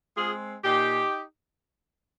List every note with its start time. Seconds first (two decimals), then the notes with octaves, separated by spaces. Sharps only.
0.17 G#3 C4 F4 G#4
0.64 A#2 D#4 G4